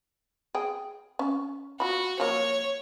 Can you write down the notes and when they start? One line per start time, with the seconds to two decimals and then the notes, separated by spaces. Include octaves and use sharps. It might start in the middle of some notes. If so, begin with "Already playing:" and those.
0.55 G#4 G5
1.19 C#4
1.80 F4 F#4 B5
2.20 F3 F#3 A#3 C#5